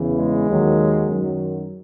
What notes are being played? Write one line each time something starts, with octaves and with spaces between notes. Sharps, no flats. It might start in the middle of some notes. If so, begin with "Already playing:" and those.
Already playing: E2 C#3 E3
G#3
D#2 D#3 F#3
F#2 D#3 F#3